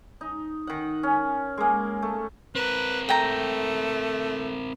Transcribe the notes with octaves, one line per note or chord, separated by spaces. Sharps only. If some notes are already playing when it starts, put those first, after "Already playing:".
D#4
D#3 F#5
C#4
G#3 A#3
A3
C4 A#4 B4
A3 G5 A#5